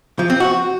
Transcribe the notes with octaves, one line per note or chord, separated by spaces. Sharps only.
F3
C4
F#4